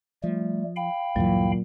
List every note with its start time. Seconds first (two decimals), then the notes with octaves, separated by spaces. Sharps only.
0.24 F3 G3 A3
0.76 F5 G5 B5
1.16 D2 G2 A#2 E3 F#3